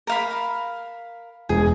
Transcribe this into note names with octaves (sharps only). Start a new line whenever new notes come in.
A#4 F5 B5
E1 G#4